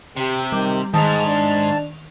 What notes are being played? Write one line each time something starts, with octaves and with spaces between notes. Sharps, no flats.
C3 G4
D#3 G3
G#2 D#3 G#3 A5 F7
D4